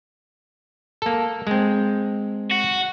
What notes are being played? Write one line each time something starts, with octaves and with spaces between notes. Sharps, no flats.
A#3 A4
G#3 C4
F#4